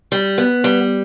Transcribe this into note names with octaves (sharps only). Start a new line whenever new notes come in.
G3
B3
G3